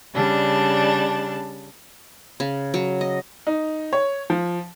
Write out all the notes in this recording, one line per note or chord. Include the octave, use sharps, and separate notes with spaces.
C#3 G3 D4 A5
C#3
F#3
D#5
D#4
C#5
F3